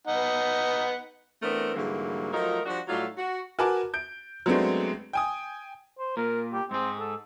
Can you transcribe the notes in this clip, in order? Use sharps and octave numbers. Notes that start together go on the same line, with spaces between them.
B3 D#4 F#5
E3 A3 B3 C4 D4 A#4
G#2 D3 E3 F#3 G3 A#3
F3 F#3 A3 D#4 F4 A#4
F3 G3 D4 F#4
A2 F#3 G3 A3 D#4 F4
F#4
F#4 A#4 B4 G#5 A5 D6
G6 D7
F#3 G#3 A3 B3 C4 D4
G5 G#5 D#6
C5
A#2 A#4
G4
G#2 C4 G#4
A4